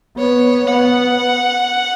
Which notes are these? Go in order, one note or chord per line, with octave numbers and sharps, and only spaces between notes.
B3 C#5
B3 F#5